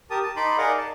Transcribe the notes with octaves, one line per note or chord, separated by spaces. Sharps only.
G4 A#4 A5 D#6
A5
D#4 B5 C6 D6
G#4 A#4 D5 D#5 F5 F#5
A5